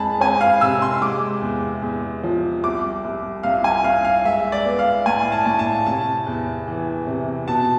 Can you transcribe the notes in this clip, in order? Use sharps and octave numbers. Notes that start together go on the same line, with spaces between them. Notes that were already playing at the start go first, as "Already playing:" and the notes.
Already playing: F2 G#3 A5 B5
C4 G#5
F5
C3 E6
C6
G#3 D6
E2
E2
F3
C2 D6
C2
C2 F5
G#5
C2 F5
F5
G#3 E5
D5
B3
F5
A2 G#5
A5
A2
A5
C3 A5
E2
E3
C3
B2 A5